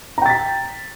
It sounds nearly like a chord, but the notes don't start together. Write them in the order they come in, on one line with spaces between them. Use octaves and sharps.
A#5 G5 A6 B6